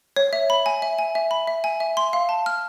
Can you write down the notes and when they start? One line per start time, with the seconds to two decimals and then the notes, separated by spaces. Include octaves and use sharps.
0.16 C#5
0.33 E5
0.50 B5
0.66 G#5
0.82 E5
0.98 G#5
1.15 E5
1.31 B5
1.47 E5
1.64 G#5
1.80 E5
1.97 C6
2.13 F5
2.29 A5
2.46 F6